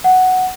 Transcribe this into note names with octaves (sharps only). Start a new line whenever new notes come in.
F#5